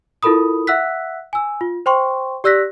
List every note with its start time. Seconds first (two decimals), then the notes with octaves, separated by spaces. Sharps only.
0.23 E4 F4 A4 A#4 B5 D#6
0.67 E5 F#5 E6 F#6 B6
1.33 G#5 E6
1.61 F4
1.86 C5 G5 C6 C#6
2.44 G4 D5 E6 F#6 A#6 B6